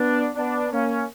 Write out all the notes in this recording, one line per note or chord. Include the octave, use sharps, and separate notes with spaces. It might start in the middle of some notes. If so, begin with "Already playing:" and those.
Already playing: B3 D4
B3 D4
A#3 C#4